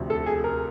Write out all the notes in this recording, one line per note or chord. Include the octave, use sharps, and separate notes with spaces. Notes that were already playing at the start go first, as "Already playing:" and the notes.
Already playing: D2 C3 F3
A4
G#4
A#4